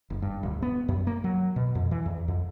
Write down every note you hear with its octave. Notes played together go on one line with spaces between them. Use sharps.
F#1
G2
D1
B3
F#2
A#3
F#3
B2
F2
E3
E2
F2